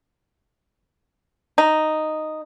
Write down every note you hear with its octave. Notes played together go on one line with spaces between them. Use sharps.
D#4